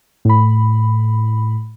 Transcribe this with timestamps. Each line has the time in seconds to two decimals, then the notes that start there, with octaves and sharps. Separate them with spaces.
0.25 A2 B5